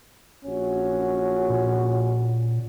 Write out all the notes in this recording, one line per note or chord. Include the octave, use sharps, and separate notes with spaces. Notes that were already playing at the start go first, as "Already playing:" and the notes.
A#1 C#4 F#4
A#2